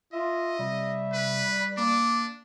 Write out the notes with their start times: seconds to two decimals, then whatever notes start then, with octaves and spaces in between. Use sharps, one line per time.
0.13 F4 D#5 E5
0.58 C3 G3
1.13 B4
1.77 A#3 D4 D6